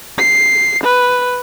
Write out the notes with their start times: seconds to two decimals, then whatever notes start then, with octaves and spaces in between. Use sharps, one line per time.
0.18 C7
0.84 B4